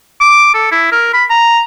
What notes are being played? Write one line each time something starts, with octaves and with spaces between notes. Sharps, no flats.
D6
A4
E4
A#4
B5
A#5